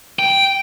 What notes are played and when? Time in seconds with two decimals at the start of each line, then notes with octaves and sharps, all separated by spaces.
0.19 G5